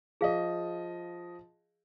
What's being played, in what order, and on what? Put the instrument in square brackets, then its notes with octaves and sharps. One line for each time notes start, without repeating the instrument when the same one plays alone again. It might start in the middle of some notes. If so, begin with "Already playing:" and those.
[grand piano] F3 D#5 [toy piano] G#4 F5